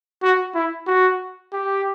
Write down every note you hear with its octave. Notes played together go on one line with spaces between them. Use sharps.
F#4
E4
F#4
G4